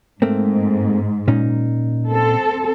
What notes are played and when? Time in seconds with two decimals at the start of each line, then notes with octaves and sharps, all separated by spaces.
0.22 G#2 A3 A#3 C4
1.28 A#2 C#4 D#4
2.10 C4 A4